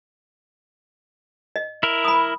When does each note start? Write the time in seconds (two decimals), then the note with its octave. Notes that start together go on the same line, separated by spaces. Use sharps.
1.56 D#5
1.83 E4 A#4
2.05 B5 D#6